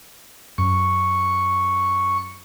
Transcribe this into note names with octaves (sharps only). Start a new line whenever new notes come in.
F#2 C#6